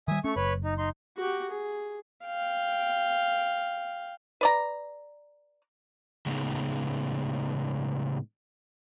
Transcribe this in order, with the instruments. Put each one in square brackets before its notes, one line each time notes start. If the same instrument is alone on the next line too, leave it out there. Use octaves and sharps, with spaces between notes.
[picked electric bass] D#3 G3 [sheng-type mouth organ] E5 G#5 D#6
[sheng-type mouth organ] A3 C#6 [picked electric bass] C#4
[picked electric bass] F#1 [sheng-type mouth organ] B4 C#5 B5
[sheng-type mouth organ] D#4
D#4 C6
[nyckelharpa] F#4 G4
G#4
F5 G5
[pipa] B4 D5 A#5
[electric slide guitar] A2 C#3 G#3 B3 D#4